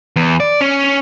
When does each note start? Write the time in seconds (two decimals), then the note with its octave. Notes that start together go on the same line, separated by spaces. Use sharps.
0.16 E2
0.40 D5
0.61 C#4